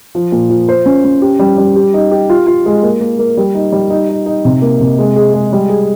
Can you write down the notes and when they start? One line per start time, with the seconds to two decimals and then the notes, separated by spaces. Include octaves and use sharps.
0.15 F3
0.32 A#2
0.50 F3
0.69 C5
0.86 C#4
1.04 C#4
1.22 G4
1.39 G3
1.58 G3
1.76 G4
1.94 D#4
2.11 G4
2.30 F4
2.47 F4
2.66 G#3
2.83 A#3
3.01 A#3
3.19 A#3
3.37 G3
3.54 D#4
3.72 G3
3.90 D#4
4.09 D#4
4.26 D#4
4.45 C3
4.62 A#3
4.80 C3
4.98 G#3
5.16 G#4
5.34 G#3
5.53 G3
5.69 G#4